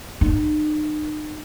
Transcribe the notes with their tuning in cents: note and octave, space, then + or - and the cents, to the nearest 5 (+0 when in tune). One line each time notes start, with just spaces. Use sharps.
D#4 -40